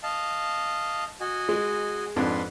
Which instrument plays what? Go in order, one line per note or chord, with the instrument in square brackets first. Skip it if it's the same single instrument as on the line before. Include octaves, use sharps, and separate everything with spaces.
[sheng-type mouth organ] D#5 F5 A5
F#4 D#5 G#5
[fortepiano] G#3
[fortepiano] F2 G#2 D4 [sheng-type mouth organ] B4 C6